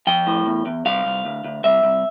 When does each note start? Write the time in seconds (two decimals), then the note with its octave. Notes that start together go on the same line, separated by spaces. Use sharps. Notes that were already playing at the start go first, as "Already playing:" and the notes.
0.07 F3 G5
0.27 A2
0.46 E2
0.66 E2
0.85 C2 F5
1.05 C2
1.25 D2
1.44 D2
1.64 C2 E5
1.83 C2